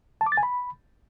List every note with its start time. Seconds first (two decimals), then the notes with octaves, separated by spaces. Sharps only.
0.21 A5
0.26 D6
0.32 A6
0.37 G#5
0.43 B5